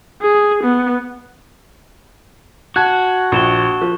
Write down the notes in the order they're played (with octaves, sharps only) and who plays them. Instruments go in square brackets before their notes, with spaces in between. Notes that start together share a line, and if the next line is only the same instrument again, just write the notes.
[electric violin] G#4
B3
[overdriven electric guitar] F#4 [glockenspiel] A5 F#6 [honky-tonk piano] G#6
[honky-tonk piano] A#1 [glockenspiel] C#6 E7 G7
[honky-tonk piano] F3